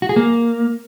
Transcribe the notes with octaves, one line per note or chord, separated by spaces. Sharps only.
F#4
G#4
A#3